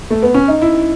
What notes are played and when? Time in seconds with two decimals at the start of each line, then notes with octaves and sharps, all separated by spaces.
0.10 A3
0.23 B3
0.34 C#4
0.48 D#4
0.61 E4